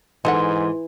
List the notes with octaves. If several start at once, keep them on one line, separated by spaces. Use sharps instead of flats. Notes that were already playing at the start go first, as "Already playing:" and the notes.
G#2 E3 D#4 A4 F#5 C6